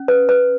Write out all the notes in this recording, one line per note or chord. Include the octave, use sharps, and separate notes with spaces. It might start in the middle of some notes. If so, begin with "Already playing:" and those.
Already playing: C#4
B4
B4